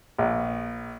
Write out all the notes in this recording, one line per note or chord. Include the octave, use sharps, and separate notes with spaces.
A#1